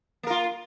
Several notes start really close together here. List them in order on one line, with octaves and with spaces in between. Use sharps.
A#3 A#4 F4